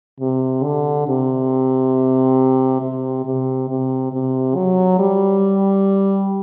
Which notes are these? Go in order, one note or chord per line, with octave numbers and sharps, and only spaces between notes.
C3
D3
C3
C3
C3
C3
C3
F#3
G3